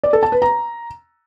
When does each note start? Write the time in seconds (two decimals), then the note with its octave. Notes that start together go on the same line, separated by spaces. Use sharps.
0.03 D5
0.13 A4
0.23 A5
0.32 B4
0.42 A#5